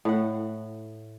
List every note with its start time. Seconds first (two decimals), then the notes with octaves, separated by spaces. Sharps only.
0.05 A2 F#5